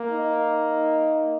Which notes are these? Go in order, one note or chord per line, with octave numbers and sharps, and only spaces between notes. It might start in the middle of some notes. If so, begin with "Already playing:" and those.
Already playing: A#3
D#4